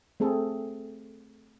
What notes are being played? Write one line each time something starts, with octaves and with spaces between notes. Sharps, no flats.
A3 C4 G#4 A4